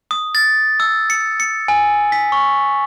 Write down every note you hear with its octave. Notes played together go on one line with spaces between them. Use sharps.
D#6
A6
E6
C#7
C#7
G#5
B6
C#6